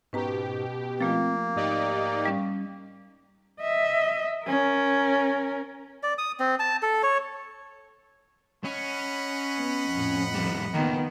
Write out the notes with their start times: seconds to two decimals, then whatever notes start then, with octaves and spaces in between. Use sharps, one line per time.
0.13 G#2 B2 C#4 G4 B4 A#5
1.01 F3 A3 A#3 C4 F4
1.56 G#2 D#4 G4 D5
2.25 G3 C#4
3.61 D#5 E5
4.46 C#4 A#4
6.03 D5
6.18 D#6
6.40 C4
6.60 A5
6.83 A4
7.03 C#5
8.64 C#4 D#5 F#5 B5
9.58 B3
9.91 F2 A2
10.34 D#2 G3
10.74 C#2 D#3 A#3 B3